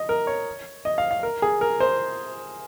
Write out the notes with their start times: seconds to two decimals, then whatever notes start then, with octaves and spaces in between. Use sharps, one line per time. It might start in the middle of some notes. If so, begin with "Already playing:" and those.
Already playing: D#5
0.09 A#4
0.27 C#5
0.85 D#5
0.98 F5
1.11 F5
1.23 A#4
1.42 G#4
1.61 A#4
1.80 C5